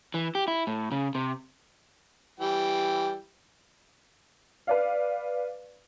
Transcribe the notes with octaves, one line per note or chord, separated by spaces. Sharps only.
E3
G4
E4
A2
C#3
C3
E3 G3 G5
B4 D5 F5